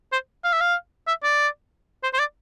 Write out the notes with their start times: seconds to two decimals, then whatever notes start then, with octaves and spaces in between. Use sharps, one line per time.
0.12 C5
0.44 F5
0.52 E5
0.60 F5
1.08 E5
1.24 D5
2.03 C5
2.13 C5
2.19 D5